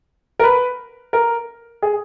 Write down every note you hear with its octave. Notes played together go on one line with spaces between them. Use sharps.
A#4
B4
A#4
G#4